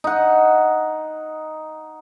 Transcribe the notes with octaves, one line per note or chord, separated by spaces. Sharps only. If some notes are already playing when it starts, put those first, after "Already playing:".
D#4 F#5